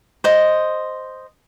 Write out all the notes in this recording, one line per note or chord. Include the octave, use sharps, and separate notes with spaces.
C5 D#5